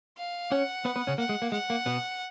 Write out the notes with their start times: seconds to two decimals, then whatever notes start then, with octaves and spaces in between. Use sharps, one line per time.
0.18 F5
0.51 C#4 C#5 F#5
0.85 B3 B4
0.96 B3 B4
1.07 C#3 C#4
1.18 A#3 F#5
1.29 G#3
1.42 A#3
1.52 G#3 F#5
1.70 A#3
1.86 B2 B3